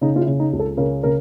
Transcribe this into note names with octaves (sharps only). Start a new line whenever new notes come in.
C#3 D#4
F4
E4
C#3
D#4
C#2
A4
C#3 A#4
C#3 A#4